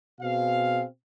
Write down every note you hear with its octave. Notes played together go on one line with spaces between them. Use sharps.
B2 C4 G#4 F5